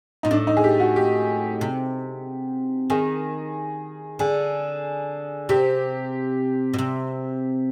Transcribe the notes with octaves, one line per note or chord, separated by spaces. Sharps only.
A#2 D#4
A2 D4
D#4
G#4
G4
F#4
G4
C3
D#3 G#4
D3 G#4
C3 G4
B2
C3